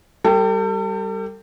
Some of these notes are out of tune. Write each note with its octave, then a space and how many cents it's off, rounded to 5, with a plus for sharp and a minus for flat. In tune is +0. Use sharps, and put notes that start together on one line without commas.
G3 +0 A4 +40 G5 +0